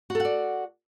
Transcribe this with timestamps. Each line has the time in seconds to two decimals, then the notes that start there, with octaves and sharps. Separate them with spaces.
0.10 F#4
0.15 A4
0.20 F#5
0.25 D5